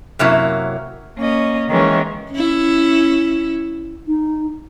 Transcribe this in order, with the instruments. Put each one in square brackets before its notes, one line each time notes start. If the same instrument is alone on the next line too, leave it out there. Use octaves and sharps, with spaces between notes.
[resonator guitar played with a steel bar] F#2 C3 F#3 A#3 E4
[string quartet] A#3 C#4 D#5
D#3 E3 G#3 A#3 C#4
[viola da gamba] C#4 E4
[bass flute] D#4